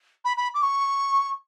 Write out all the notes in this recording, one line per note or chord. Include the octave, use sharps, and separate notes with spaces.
B5
B5
D6
C#6